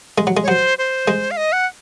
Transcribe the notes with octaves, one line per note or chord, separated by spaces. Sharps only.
G#3
F#3
G#3
C#5
F#3 C5
C5
G#3
F5
D#5
F#5